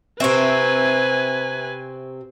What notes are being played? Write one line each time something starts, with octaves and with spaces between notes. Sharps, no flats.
C3 C4 B4 C5 E5 G#5 C#6 D7